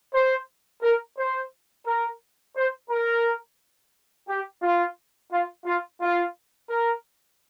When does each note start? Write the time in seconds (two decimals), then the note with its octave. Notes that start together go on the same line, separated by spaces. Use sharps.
0.14 C5
0.82 A#4
1.18 C5
1.86 A#4
2.56 C5
2.90 A#4
4.28 G4
4.62 F4
5.32 F4
5.66 F4
6.01 F4
6.70 A#4